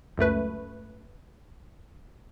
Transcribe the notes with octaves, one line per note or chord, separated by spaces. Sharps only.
C#2 F#2 A3 B4